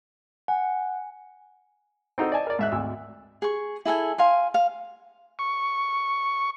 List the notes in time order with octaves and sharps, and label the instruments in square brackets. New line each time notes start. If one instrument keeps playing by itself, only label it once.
[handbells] F#5 [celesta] G#5
[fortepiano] C4 D#4 F#4 A4
D5 D#5 G#5 A5
A#4 D5
G#2 E5 F#6
G#1 D2 E6
[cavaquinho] G#4 C#6
E4 G#4 A4 G#5
F5 G#5 C6
F5
[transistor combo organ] C#6